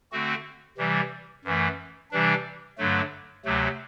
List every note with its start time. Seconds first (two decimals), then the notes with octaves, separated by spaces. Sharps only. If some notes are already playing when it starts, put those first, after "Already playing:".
0.12 D3 A3 C4 F#4
0.78 C3 E3 G3
1.45 F#2 E3 A3
2.11 C3 E3 G3 D4
2.78 G2 D3 F#3 A3
3.45 D2 C3 F#3 A3